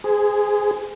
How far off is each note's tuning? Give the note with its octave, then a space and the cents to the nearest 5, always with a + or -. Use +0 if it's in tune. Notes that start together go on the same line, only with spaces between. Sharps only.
G#4 +0 C5 -30